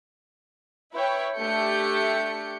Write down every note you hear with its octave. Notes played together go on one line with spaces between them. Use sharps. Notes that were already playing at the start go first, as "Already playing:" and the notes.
E4 B4 C#5 G5
A3 D4 G4 G6 C#7